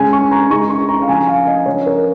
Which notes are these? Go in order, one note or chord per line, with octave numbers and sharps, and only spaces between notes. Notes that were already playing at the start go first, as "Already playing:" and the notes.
Already playing: C#3 G#3 C#4 G#5
C#6
A#5
C#3 G#3 D#4 C#6
C#6
A#5
F5
F3 C#4 G#5
F5
D#5
C#3 F3 C#4 C#5
A#4